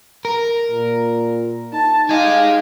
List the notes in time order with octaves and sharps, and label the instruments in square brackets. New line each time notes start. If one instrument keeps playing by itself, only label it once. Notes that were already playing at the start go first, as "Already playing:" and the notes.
[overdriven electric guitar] A#4
[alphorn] A#2
[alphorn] D#4 [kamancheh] A5
[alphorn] D#4 [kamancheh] G4 F5 [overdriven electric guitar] G#4 D#5